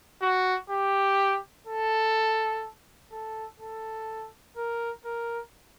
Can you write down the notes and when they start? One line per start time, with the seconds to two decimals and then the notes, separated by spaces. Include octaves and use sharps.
0.22 F#4
0.70 G4
1.67 A4
3.12 A4
3.60 A4
4.57 A#4
5.05 A#4